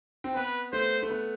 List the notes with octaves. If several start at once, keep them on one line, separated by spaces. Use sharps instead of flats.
C4
B3 B4
A3 C5
A3
B3